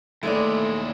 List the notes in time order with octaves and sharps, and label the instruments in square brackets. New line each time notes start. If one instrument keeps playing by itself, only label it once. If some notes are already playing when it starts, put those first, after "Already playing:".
[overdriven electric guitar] D#2 E4 [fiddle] G#3 [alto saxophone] A3 [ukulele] G#4 B4 D5